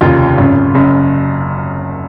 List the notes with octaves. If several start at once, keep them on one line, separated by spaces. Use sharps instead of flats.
F1 D#2 C#3 F4
G#1 F#2 C#3
F#1 F#2 C#3